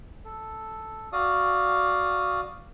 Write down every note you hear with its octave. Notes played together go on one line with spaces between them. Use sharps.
A4
F#4 D5 F5 D#6